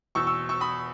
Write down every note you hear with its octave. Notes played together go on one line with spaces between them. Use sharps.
E2 B2 C#6 E6
C#6 E6
C#6 E6
B5 D#6